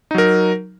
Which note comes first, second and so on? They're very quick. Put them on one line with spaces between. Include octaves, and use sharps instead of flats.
D#4 F#3 A#4